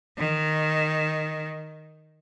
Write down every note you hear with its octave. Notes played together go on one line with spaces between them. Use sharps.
D#3